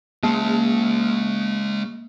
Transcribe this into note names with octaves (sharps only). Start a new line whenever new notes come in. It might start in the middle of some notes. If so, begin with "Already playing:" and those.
G#3 A#3 C#4